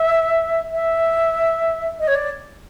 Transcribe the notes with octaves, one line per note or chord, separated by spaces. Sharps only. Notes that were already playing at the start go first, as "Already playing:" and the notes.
Already playing: E5
E5
D#5
C#5
D5